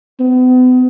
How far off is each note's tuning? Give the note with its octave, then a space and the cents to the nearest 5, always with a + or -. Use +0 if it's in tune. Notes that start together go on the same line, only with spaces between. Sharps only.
B3 +40